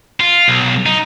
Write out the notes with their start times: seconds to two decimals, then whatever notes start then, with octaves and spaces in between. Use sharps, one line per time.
0.20 F4
0.48 B1
0.86 D#4